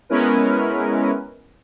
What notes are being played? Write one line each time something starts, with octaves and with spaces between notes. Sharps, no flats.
G#3 B3 C#4 E4 A#4 B4